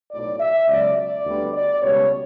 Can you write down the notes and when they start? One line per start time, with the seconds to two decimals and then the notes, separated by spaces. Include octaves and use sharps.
0.11 B1 A2 F#3 D5
0.40 E5
0.68 C#2 B2 F#3 D5
0.97 D5
1.25 D2 D3 G3 B3
1.54 D5
1.83 C#2 B2 G3 B3 C#5